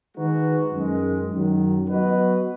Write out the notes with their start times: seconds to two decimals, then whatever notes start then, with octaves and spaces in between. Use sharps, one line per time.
0.17 D#3 G#3 D#4 F#4 B4
0.73 F#2 D#3 G#3
1.31 F#2 D#3 F#3
1.88 F#3 B3 F#4 B4 D#5